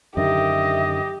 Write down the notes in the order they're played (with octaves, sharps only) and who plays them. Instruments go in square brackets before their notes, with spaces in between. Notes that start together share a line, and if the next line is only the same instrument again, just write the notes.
[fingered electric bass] F#2 D3 D#3 [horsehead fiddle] G4 [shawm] D#5 [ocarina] E5